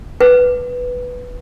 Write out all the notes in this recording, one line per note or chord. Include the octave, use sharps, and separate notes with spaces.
B4